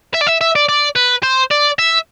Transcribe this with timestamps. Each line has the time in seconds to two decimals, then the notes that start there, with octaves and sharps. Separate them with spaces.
0.14 E5
0.21 D5
0.27 E5
0.41 E5
0.55 D5
0.69 D5
0.96 B4
1.23 C5
1.51 D5
1.79 E5